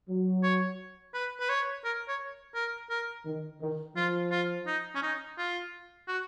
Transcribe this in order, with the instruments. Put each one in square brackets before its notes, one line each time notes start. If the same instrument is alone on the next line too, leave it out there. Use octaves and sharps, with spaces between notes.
[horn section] F#3
[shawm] C#5
B4
B4
C#5
A#4
C#5
A#4
A#4
[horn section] D#3
D#3
[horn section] F3 [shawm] F4
[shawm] F4
D#4
C#4
D#4
F4
F#4